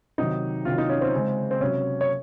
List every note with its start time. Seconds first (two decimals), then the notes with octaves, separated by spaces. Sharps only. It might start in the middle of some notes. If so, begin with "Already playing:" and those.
0.18 C3 D#3 F#3 D#4
0.65 C3 D#3 F#3 F4
0.78 D#4
0.89 C#4
1.01 C4
1.13 C#3 G#3
1.51 C4
1.61 C3 F#3 C#4
2.01 C#5